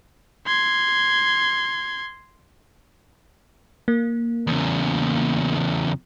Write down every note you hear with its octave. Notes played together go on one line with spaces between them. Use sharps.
C6 G#6
A#3
E2 C#3